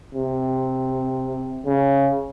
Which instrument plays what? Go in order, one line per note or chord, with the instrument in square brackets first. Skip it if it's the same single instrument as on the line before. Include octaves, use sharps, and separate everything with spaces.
[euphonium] C3
C#3